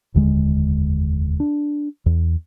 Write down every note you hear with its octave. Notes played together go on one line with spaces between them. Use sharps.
F1 D#2 D3 G#3
D4
E2